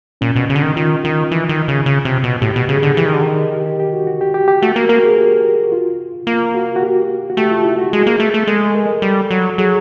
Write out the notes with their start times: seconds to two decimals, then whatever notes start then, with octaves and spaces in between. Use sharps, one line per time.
0.21 A#2 C#4
0.36 B2
0.49 C#3
0.56 D3
0.63 D#3
0.76 D#3 F4
1.04 D#3 F4
1.31 E3
1.49 D#3
1.68 C#3
1.86 C#3
2.05 C3
2.23 B2
2.41 A2 G4
2.56 B2
2.69 C#3 G#4
2.83 D3
2.97 E3 G4
3.06 D#3
3.13 D3
3.22 D#3
3.52 G4
3.65 G4
3.80 G4
3.93 F#4
4.07 F#4
4.21 G4
4.34 G4
4.48 G4
4.62 A3 F#4
4.76 A#3 A#4
4.89 A#3 A#4
5.03 G#4
5.17 G4
5.63 F#4
5.72 F4
6.27 A#3 F4
6.55 F#4
6.76 F#4
6.82 G4
7.30 F#4
7.37 A3 G4
7.51 F4
7.65 E4
7.78 F#4
7.93 G#3 G#4
8.07 A#3
8.20 A3
8.34 A3
8.47 G#3 A4
8.75 A#4
9.02 G3 A4
9.31 F#3
9.58 F#3 G#4